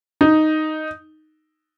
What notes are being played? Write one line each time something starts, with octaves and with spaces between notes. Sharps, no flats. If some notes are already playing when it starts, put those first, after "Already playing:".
D#4